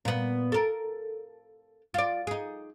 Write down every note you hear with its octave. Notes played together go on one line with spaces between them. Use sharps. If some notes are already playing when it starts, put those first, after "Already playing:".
A#2 B3
A4 A#4
F4 D5
D#4 G#4